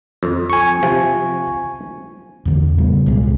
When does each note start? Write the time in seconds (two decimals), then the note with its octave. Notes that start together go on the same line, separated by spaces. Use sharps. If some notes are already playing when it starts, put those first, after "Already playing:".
0.23 F2
0.50 G#5 C#6
0.83 C3 F3
2.45 E2 D3
2.78 A2 C#3 G3 B3
3.06 C#2 B2 G#3